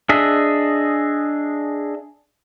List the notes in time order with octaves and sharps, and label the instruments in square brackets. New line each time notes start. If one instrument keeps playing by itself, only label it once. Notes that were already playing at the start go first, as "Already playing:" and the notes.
[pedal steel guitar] D4 G#4 D#5 E5